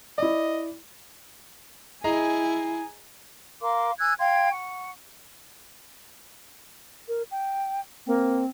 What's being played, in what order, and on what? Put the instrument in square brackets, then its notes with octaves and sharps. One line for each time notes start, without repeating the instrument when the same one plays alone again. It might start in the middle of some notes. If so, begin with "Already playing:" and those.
[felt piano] E4 D5 [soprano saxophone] D#5
[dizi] E4 [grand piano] G#4 D#5 A#5 [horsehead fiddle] G#5
[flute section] A#4 F5 C6 D6
G#5 E6 F#6 G#6
F5 G5 C6 G#6
F#5 C#6
[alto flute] A#4
G5
[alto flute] A#3 [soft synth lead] C4